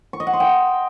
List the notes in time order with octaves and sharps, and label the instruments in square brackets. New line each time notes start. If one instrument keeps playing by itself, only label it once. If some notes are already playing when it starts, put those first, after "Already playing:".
[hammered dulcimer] C#6
D#5
F#5
C6
G5